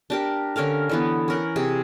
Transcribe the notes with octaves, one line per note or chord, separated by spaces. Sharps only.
D4 G4 A#4
D3 C#4 A#4 F5
D3 E3 B3
C#4 A#4 F#5
C3 G4 G#4